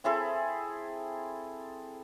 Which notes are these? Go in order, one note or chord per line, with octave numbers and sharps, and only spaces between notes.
C4 E4 G#4 A4